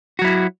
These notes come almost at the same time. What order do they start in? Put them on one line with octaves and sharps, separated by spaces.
F#4 F#3 E4